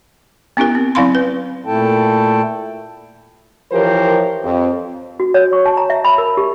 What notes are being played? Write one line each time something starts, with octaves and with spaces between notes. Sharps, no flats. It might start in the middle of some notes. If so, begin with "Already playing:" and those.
B3 C#4 E4 G4 A#4
C4
F#3 C4 E4 F5 B5 C6
B4
A#2 A3 E4 A4 G5 A5
E3 F3 G4 A#4 C5 C#5
F2
F#4
C#5
C#6
A5
A#5
E5
B5
A#4
G4